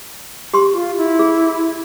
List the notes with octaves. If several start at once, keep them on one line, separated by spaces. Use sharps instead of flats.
G4 C6
F4
E4
G#4